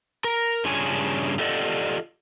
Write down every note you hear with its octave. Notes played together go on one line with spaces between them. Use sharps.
A#4
G2 C#3 D4 F4 C#5 G#5
F4 G4 A4 D5 D#5 F#5